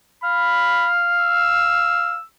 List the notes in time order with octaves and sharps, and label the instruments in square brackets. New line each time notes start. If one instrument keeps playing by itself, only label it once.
[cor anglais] F5 [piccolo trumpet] B5
[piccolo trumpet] E6